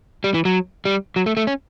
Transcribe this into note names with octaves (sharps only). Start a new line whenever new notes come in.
G3
E3
F#3
G3
F#3
A3
A3
C#4